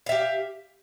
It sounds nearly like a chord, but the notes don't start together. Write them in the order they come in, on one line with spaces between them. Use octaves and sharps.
F5 E5 G4